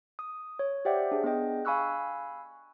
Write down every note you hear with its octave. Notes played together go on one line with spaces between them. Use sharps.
D#6
C#5
G4 C5 D5 E5 F#5 G5
D4 G#4
B3 D4 G#4 D#5 G5
F5 G#5 B5 C#6 E6 F#6